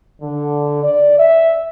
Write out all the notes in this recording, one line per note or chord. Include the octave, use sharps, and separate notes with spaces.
D3
D5
E5